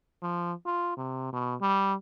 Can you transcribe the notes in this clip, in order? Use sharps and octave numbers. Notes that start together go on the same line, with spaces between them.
F3
F4
C3
B2
G3